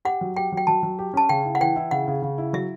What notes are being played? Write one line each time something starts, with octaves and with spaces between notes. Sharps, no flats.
G4 F#5
F#3
G4 G5
F#3
G5
F#3 A5
F#3
G4
C#4 A5
C#3 G5
E4
F#5
E3 G5
E4
C#3 F#5
C#3
C#3
E4
F#3 E5